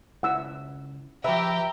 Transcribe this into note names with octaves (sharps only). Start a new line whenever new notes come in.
C#2 E4 F#5 E6
F3 G4 B4 E5 G5 A#5